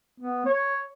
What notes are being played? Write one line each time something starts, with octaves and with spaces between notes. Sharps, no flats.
B3
C#5